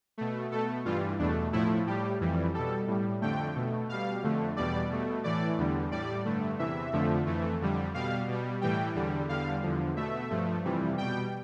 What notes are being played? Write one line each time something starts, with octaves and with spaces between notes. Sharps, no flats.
B2 A3
B2 A3 A4
G2 E3 G3 F4
E2 B2 A3 D4
A2 F3 A3 E4
A2 G3 G4
F2 E3 G3
B2 G3 A4
A2 G3
F2 D3 A3 G5
B2 A3
B2 G3 F5
F2 D3 A3
E2 B2 G3 D5
B2 A3
A2 E3 A3 D5
E2 D3 G3
A2 G3 D5
G2 D3 A3
E2 C3 E3 E5
F2 D3 F3 A3
F2 E3 A3
F2 D3 G3
B2 G3 F5
B2 G3
A2 E3 G3 G5
E2 D3 G3
E2 D3 G3 F5
E2 D3 F3
B2 A3 E5
G2 F3 A3
F2 C3 E3 G3
B2 G3 G5